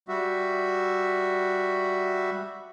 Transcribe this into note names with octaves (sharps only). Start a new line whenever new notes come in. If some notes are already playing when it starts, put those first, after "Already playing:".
G3 F#4 E5